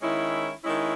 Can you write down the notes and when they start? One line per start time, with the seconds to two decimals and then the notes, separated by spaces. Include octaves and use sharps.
0.02 D#3 G#3 C#4 E4
0.64 D#3 G#3 C#4 E4